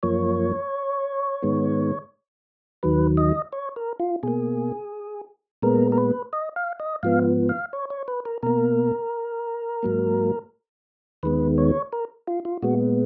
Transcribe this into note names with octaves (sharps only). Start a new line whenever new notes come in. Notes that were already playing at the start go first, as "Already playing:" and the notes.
F#2 F3 A#3 C#5
G#2 D#3 G#3 B3
D#2 D#3 F#3 B4
D#5
C#5
A#4
F4
B2 A#3 G#4
A#2 G#3 B3 A#4
A#4
B4
D#5
F5
D#5
G#2 F3 B3 F5
F5
C#5
C#5
B4
A#4
B2 A#3 A#4
G#2 F#3 A#3
D#2 D#3 G#3 B3 B4
C#5
A#4
F4
F4
A#2 G#3 B3 F#4